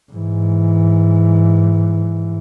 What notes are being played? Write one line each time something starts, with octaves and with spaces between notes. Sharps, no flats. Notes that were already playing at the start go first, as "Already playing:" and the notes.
G#2 E3